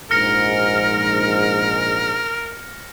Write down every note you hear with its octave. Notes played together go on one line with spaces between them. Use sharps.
A#1 G#2 A#4 F6 A#6 C#7